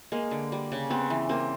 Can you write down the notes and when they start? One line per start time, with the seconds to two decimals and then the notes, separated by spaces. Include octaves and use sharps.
0.12 G#3 A#3
0.31 D3
0.52 G3
0.72 C#3
0.90 B3 C4
1.10 E3
1.29 A#3 C4